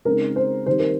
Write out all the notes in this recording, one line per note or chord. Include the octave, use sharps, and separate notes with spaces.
C#3 G#3 C4 D#4 A#4
C5
D#3 G3 C4 D#4 C5
A#4